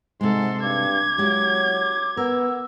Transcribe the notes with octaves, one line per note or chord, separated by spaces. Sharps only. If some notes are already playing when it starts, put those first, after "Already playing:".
G#2 C3 G#3 A4 C6
G2 D6 G#6
F#3 G#3 E4 G4
D6
B3 A#4 E6